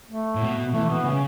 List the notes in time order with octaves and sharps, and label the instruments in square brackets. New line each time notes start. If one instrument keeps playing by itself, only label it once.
[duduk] A3
[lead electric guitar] A2
B2
[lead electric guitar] E3 [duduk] A3
[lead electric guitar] B2 [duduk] B3
[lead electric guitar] C#3 [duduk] C#4